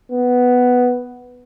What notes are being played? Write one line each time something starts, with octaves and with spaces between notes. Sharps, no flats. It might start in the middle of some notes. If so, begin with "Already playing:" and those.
B3